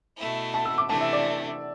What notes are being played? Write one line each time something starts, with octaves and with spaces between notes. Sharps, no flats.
B2 A3 E4
A5
E6
D6
C3 E3 A3 D4 A5
E5
D5